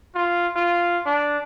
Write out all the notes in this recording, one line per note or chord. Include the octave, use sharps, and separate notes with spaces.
F4
F4
D4